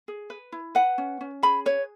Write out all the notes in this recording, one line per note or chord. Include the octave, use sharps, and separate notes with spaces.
G#4
B4
E4
B4 F#5
C#4
C#4
G#4 B5
B4 C#5